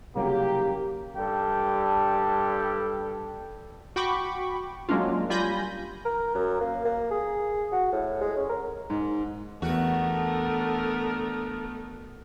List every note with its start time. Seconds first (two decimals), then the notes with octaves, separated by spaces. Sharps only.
0.16 C2 C#3 F#3 A#3 G4
1.16 G2 G4 A4
3.96 F#4 G5 B5 C#6 D6
4.89 F#3 G#3 A#3 C#4 D4 F4
5.30 G3 F4 G#5 B5 G6 A#6
6.05 A#4
6.35 F#2
6.61 A#3
6.85 A#3
7.11 G#4
7.72 F#4
7.93 A2
8.21 G#3
8.37 C#4
8.49 A#4
8.90 G#2
9.62 E2 A3 B3 D4 F#4 A4 A#4